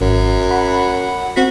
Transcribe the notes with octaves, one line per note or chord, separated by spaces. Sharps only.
G#1 F#2
F#5 B5
C4 F#4 B6